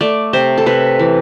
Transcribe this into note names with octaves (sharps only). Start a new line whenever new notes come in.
A3 D5
C3 C5
A4
C3 B4
E3